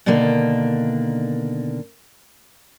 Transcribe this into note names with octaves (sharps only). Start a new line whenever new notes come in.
B2 D3 D#3 A#3 D4